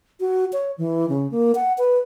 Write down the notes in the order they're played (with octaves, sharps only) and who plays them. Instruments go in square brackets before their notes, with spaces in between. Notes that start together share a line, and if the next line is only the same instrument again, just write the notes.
[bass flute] F#4
C#5
E3
C#3
A#3
F#5
B4